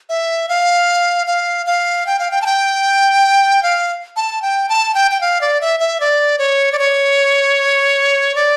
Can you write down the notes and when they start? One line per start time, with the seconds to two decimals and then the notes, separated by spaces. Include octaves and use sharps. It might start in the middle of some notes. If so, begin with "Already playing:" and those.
0.09 E5
0.49 F5
1.27 F5
1.66 F5
2.07 G5
2.19 F5
2.31 G5
2.42 A5
2.46 G5
3.63 F5
4.16 A5
4.42 G5
4.69 A5
4.95 G5
5.11 G5
5.21 F5
5.41 D5
5.61 E5
5.80 E5
6.00 D5
6.38 C#5
6.72 D5
6.79 C#5
8.35 D5